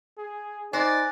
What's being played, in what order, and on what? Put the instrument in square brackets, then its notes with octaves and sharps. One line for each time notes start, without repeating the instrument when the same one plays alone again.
[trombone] G#4
[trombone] D#4 [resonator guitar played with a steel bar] C5 [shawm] D5 [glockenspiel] G#5 F#6 A#6